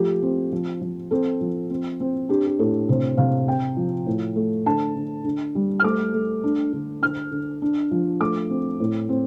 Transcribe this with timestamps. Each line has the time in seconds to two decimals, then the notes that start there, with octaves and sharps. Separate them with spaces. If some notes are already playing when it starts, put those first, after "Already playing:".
Already playing: F3 A3 G4
0.22 C4
0.52 F3
0.81 F3
1.11 C4 A4
1.41 F3
1.70 C4
2.00 C4
2.29 D4 G4
2.47 G4
2.59 A2 A4
2.89 C3 C5
3.17 C3 F5
3.47 C4 G5
3.77 F3
4.06 A2
4.36 A3
4.66 D3 A5
4.95 D3
5.24 D3
5.55 G3
5.80 F6
5.84 A3 D6
6.14 A3
6.44 D4
6.73 D3
7.02 D3 F6
7.31 D3
7.62 D4
7.91 F3
8.20 A3 D6
8.50 C4
8.80 A2
9.09 C4